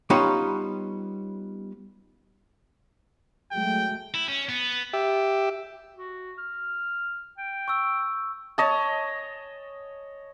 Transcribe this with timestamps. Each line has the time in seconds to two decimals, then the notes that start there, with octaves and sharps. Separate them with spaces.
0.10 G3 B3 C#4 D#4 F4 C#5
3.52 F#3 G#3 A3 G5
4.14 E4
4.28 C#4
4.49 B3
4.93 G4 E5
5.95 F#4
6.38 F6
7.38 G5
7.68 C#6 E6
8.58 C#5 D#5 A5